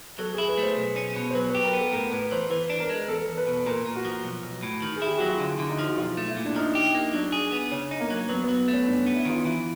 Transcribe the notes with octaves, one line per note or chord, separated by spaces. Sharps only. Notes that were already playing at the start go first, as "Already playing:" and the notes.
F#3 A4
G#4
E4
B4
A3
C5
B1
C#4
B2
C5
F#3 B4
B4
G4
A#4
B3
A4
A2 A#4
A2 B4
E3 C5
E3 B4
D4
A#4
G#3
E2 A4
E2
B4
B2
A#2 A#4
A#2
F#4
F3
B1
B1
A2
D#3
G#4
E4 G4
F#3 F#4
F4
D3 E4
D3
D#4
F3
F#4
B1 F4
A3
E4
A#2
D4
F3 D#4
G4
A#3
F#3 D4
G#4
B3
C#3 C#4
D#4
A#3
F#3
F#3 B3
B3
F#3
A3
C#4
G2 D4
B3
E4
D#3 F4
E3 E4